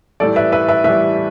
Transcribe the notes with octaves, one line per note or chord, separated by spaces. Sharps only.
A2 E3 G3 A4 D5
B4 E5
B4 E5
B4 E5
A2 E3 G3 B4 E5